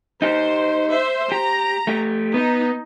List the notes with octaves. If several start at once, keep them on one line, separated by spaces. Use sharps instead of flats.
D#4 G4 C5
C5 E5
G4 A#5
A3 G4
B3 D#4